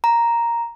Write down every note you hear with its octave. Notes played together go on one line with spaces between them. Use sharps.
A#5